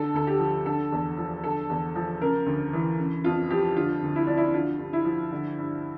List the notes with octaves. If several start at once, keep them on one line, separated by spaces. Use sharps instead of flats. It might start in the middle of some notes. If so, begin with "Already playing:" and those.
Already playing: D3 A4
D2 A4
G4
F3
D3 A4
E2
F3
D3 A4
E2
F3
C#3 A#4
D2
E3
C#3
F2 F4
F3 G4
D3 F4
D2
E4
F3 D4
E4
D3 F4
G2
E4
F3
D3
G2